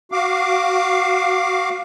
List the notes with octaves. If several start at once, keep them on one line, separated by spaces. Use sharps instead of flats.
F#4 F5 D6